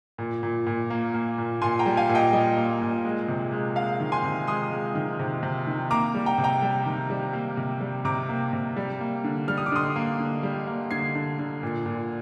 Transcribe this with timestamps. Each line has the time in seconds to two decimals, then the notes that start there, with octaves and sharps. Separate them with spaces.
0.18 A#2
0.43 A#2
0.67 A#2
0.90 A#3
1.14 A#3
1.38 A#2
1.62 A#2 G#5 C6
1.79 G5 A#5
1.86 G3
1.97 F5 G#5
2.09 A#2
2.15 D#5 G5
2.33 G3 D#5
2.57 A#3
2.81 A#2
3.05 G#3
3.28 C3
3.52 G#3
3.76 G#3 F5
4.00 D#3
4.12 G#5 C6
4.24 C3
4.47 G#3 C6 D#6
4.72 G#3
4.95 D#3
5.19 C3
5.43 C3
5.67 D#3
5.90 A#3 A#5 D6
6.15 G3
6.26 G5 A#5
6.38 C3
6.44 G5 A#5
6.62 G3
6.86 D#3
7.10 G3
7.33 A#3
7.57 C3
7.81 G3
8.05 C3 A#5 D6
8.29 A#3
8.53 C3
8.76 G3
9.00 A#3
9.24 D3
9.48 G3 F6
9.57 D#6
9.66 D6
9.72 D3 C6 D#6
9.96 A#3
10.20 D3
10.43 G3
10.67 A#3
10.91 D3 G#6 C7
11.15 D3
11.39 D3
11.63 A#2
11.86 A#2